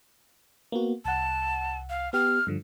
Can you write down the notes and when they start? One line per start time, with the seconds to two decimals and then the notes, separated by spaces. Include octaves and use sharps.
0.72 A#3 B3 F#4
1.05 C2 F#5 A5
1.90 F5
2.13 B3 G4 F6
2.47 G2 D3 F3